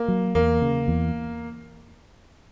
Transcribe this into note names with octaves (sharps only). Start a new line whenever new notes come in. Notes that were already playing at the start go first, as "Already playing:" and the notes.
Already playing: A#3
F#3
E2 A#3
C#3
E2